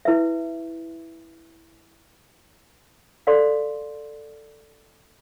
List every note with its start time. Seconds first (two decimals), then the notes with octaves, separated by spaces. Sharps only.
0.05 E4 B4 E5
3.27 A4 D5 F5 C6